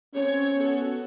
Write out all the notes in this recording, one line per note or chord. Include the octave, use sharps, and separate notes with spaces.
C4 C#4 C#5
B3 F#4 A4